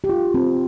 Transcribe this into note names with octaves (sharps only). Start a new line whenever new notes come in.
G4
F4
C4